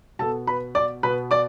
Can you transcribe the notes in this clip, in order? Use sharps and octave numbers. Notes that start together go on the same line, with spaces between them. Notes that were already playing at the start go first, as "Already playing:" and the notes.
B2 B3 A4 A5
B4 B5
D5 D6
B2 B3 B4 B5
D5 D6